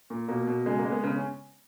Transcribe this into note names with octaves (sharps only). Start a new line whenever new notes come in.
A#2
B2 A#3
B2
C#3 G#3
A#3
G#3
B3
C#3 B3
C#4